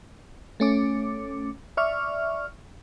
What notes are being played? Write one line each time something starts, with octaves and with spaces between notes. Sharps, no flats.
A3 C#4 D6
D5 E5 C#6 F6